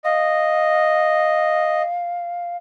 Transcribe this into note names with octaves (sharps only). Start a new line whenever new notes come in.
D#5 F5